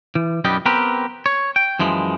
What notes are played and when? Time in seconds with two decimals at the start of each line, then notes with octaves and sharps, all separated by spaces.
0.15 E3
0.44 B1 F#2 G3 B3 G4 D#5
0.66 B3 C4 G4 A#4 B4
1.26 C#5
1.56 G5
1.79 F#2 E3 F3 G#3